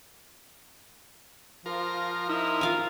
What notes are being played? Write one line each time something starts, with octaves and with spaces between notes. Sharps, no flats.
F3 F4 A#4
D#4 E4 A#4
F4 F5 G#5